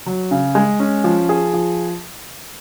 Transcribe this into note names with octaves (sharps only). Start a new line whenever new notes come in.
F#3
C#3
G#3
C#4
F3
G#4
F3